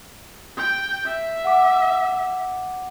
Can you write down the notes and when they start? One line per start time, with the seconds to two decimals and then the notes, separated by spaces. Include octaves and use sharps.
0.57 G5
1.06 E5
1.44 F#5 D6